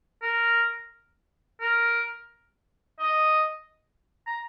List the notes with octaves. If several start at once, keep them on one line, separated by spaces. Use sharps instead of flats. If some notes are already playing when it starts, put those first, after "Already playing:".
A#4
A#4
D#5
A#5